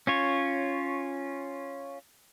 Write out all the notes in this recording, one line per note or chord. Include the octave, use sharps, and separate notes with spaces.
C#4 F4 C#5